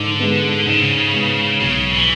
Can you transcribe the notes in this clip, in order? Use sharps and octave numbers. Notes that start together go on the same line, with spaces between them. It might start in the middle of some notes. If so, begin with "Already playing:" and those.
Already playing: G#2 D3
G#3 B3
G#2 C#3
G#3 B3
B1 C#3
E3